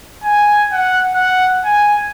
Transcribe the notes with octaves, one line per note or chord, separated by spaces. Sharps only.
G#5
F#5
F#5
G#5